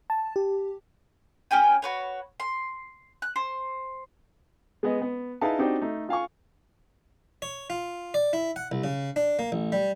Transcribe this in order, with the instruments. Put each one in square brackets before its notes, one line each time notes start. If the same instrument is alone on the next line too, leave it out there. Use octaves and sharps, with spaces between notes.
[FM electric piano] A5
G4
[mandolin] C#4 G4 G5 G#5
F#4 B4 C#5
C6
F#6
C5
[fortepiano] G#3 B3 D#5
B3
D#4 E4 G#4 B4 F5 A5
C4 D4 D#4 F#4 G4
A3 D#4
F4 F5 G#5 C#6
[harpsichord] C#5
F4
D5
E4
F#5
C2
C#3
D4
A#3
A1
G3